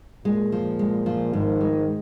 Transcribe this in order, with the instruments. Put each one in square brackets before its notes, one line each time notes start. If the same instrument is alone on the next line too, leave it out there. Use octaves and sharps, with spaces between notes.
[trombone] A#2 [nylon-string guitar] G#3
[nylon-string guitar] F3
G#3
F3
[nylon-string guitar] G#2 [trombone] D#3
[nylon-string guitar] G#3